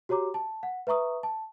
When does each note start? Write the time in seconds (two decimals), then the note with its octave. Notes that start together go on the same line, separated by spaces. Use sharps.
0.09 F#4 G4 C#5 A#5 D6
0.34 A5
0.63 F#5
0.87 B4 E5 A#5 C#6 D#6
1.23 A5